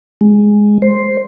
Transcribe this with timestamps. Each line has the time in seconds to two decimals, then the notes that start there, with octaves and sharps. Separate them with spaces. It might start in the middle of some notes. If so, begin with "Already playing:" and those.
0.21 G#3
0.82 C5